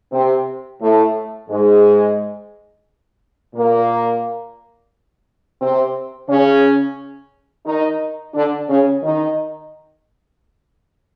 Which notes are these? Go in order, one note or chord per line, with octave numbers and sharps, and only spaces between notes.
C3 C4
A2 A3
G#2 G#3
A#2 A#3
C3 C4
C#3 C#4
D#3 D#4
D3 D4
C#3 C#4
D#3 D#4